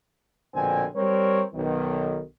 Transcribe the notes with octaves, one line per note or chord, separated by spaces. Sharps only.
A#1 B2 D3 C4 G#5
G3 C4 A#4 C#5
B1 D#3